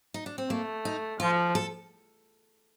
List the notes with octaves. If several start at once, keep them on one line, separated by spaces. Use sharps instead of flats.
D#4
D4
C4
A3 A#3
D#4
F3 F4
A4